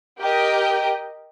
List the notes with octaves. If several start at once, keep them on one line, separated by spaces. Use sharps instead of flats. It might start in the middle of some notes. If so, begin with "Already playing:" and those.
G4 A#4 D#5 G5